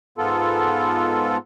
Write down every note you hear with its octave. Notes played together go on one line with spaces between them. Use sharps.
G#2 B3 F4 A4